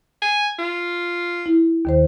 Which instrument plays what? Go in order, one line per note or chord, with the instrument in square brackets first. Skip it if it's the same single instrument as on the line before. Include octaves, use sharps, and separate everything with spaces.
[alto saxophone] G#5
F4
[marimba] E4
D#2 D#3 C5